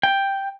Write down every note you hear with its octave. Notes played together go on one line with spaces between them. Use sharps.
G5